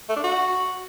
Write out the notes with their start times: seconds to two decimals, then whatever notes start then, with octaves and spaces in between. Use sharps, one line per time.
0.09 A3
0.17 D4
0.24 F#4